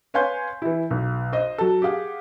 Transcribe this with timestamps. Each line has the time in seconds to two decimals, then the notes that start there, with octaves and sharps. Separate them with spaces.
0.14 B4 C#5 F5 G#5 C6 G6
0.62 E3 E4
0.91 B1
1.32 C5 D#5
1.58 F#3 A4
1.82 G4 G#4 F5 F#5